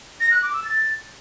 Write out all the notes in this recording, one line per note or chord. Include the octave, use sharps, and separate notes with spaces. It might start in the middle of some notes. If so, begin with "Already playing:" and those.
A#6
F#6
D6
E6
A6